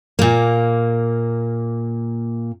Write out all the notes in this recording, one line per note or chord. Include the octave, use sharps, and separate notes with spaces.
A#2 A#3